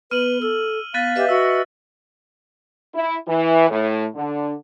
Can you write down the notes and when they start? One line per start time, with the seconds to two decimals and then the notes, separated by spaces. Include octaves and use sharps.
0.11 B3 B4 F6 D#7 F#7
0.42 A4 E6
0.94 B3 F5 F#6 A6 B6
1.16 G4 B4 D#5 E5
1.29 F#4 E6
2.94 E4
3.27 E3
3.69 A2
4.16 D3